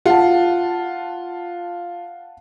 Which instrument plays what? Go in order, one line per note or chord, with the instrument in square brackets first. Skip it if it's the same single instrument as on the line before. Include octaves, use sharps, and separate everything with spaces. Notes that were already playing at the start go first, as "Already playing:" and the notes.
[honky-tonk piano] F4 [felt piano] F#5 A5